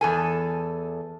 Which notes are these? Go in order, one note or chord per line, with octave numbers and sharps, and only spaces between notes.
E2 A4 G#5